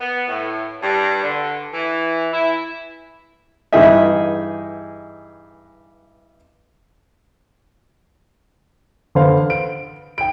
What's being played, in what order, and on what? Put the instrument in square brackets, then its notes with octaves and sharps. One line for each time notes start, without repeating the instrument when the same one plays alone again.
[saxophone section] B3
A2
G2
D3
E3
E4
[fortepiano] G2 E3 D#4 G#4 D#5 E5
[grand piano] D3 B4 C5 F5
D7
G5 D7